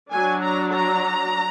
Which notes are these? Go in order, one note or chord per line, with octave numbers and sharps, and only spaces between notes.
F#3 D4 G#5
A#5
A#5